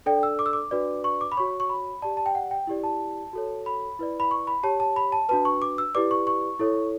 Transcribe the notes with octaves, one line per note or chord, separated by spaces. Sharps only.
D4 A4 D5 G5
E6
D6
E6
D6
D4 F#4 B4 D5
C#6
D6
B5
F#4 C#5 C#6
C#6
B5
G4 D5 A5
A5
G5
F#5
G5
E4 G4 D5
A5
F#4 A4 C#5
B5
E4 B4 D5
B5
C#6
B5
G4 C#5 A5
A5
B5
A5
D4 F#4 B4 A5
C#6
D6
E6
E4 G4 B4 D5 D6
C#6
C#6
E4 A4 C#5